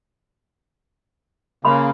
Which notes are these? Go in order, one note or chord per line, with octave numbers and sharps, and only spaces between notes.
C#3 A#3 F5 B5 C6